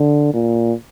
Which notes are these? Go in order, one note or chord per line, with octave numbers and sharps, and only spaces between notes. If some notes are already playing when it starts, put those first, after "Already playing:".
Already playing: D3
A#2